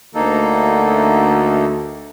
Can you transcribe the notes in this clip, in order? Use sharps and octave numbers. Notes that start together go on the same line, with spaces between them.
D2 A#3 D#4 A4